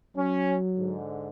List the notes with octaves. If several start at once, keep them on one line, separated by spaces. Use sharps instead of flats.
F#3 C#4
G#2 D3